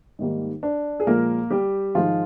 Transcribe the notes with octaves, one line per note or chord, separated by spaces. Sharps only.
G#2 D#3 G3 A#3
D4
G#4
A#2 F3 G#3 A#3 A#4
G3 G4
G#2 D#3 F3 G#3 F4